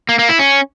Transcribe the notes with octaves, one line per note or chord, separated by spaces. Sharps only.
A#3
A#3
E4
C#4